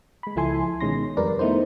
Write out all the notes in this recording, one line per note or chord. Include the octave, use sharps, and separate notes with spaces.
G#3 B5
C#2 F3 E4 A4 G#5 C6
B2 D#3 G#3 C#4 C6 A#6
F2 G3 A#4 B4 D5
A3 B3 D#4 E4 C5